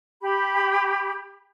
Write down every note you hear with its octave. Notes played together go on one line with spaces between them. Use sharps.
G4 B5